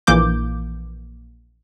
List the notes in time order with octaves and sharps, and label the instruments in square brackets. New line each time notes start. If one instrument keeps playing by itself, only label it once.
[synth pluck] A#1 E3 A#3 D6 G6